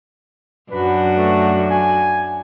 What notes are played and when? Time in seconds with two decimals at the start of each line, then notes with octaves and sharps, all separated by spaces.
0.71 F#2 D4 F#4 B4
1.13 A3
1.70 G#5